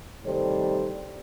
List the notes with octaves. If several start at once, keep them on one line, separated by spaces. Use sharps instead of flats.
A2 C3 D#3 G3 A4 C5